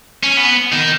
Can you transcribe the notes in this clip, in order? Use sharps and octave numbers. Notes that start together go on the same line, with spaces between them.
C#4
B3
D#3